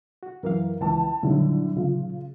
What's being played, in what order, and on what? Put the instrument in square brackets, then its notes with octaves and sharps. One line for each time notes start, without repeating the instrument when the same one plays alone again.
[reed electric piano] F#4
[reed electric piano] F#2 E3 F5 [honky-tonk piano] A#4
[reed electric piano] C#2 E3 F3 [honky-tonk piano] G5 A5
[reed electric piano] A#2 D#3 F#3 [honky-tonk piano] D3 G3 E4
[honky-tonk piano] C#3 F4